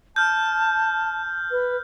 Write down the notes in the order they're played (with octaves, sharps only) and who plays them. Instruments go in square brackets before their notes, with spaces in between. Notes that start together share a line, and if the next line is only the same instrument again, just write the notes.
[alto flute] A5 [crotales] F6 G6
[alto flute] B4